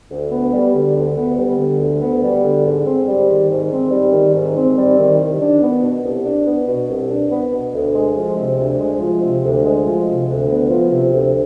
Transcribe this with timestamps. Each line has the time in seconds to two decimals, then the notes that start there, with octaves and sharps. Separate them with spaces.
0.11 D2
0.31 B3
0.53 G3
0.74 D3
0.96 D2
1.16 B3
1.38 G3
1.58 D3
1.80 D2
2.01 B3
2.23 G3
2.44 D3
2.65 G#2
2.85 C4
3.07 G3
3.28 D#3
3.49 G#2
3.71 C4
3.91 G3
4.13 D#3
4.34 G#2
4.56 C4
4.77 G3
4.97 D#3
5.19 C2
5.40 D4
5.62 B3
5.82 B2
6.04 C2
6.25 D4
6.46 B3
6.67 B2
6.89 C2
7.10 D4
7.30 B3
7.52 B2
7.73 D2
7.95 G#3
8.16 F3
8.36 C3
8.58 D2
8.79 G#3
9.00 F3
9.21 C3
9.43 D2
9.64 G#3
9.85 F3
10.06 C3
10.28 D2
10.49 B3
10.69 F3
10.91 C3
11.12 D2